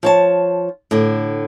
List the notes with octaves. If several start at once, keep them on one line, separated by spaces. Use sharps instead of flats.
F3 C#5 A5
A2 D3